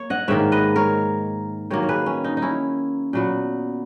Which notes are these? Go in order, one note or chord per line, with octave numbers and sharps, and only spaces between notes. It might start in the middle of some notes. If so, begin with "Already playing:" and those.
Already playing: A#3 C#5
D#5 F#5
G#2 D#3 A#3 C#5 E5
B4 D#5
A#4 C#5
D#3 F#3 A#3 A#4 C#5
C#5
G#4 B4
C#4
D#4
D#4
C#4 E4
A#2 F#3 B3